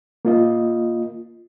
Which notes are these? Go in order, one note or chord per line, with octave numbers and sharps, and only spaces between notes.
A#3 F4 D#5